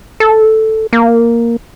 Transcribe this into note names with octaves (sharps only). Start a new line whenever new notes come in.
A4
A#3